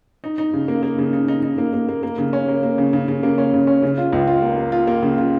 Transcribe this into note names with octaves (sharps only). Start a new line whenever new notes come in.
D#4
D#4
C#3
A#3
A#3
C#3
D#4
D#4
D#4
A#3
A#3
A#3
A#3
C#3
C#4
A#3
A#3
C#3
C#3
C#3
A#3
C#4
C#3
C#4
C#3
F4
C#2
F4
A#3
A#3
F4
A#3
C#3
F4